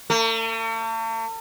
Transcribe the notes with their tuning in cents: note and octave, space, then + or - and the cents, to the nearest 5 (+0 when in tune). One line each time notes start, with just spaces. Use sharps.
A3 +45